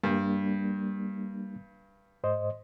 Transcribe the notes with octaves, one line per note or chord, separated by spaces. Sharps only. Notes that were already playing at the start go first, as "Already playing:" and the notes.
G2 G3 A#3 D4
G#2 C5 D#5